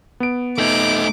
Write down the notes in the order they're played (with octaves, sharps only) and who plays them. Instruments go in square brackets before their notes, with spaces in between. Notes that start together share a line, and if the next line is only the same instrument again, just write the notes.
[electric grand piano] B3 D7
[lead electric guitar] A3 D#4 [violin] D6